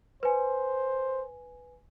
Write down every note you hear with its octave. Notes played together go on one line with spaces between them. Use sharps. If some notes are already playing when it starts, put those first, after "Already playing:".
B4 C5 G#5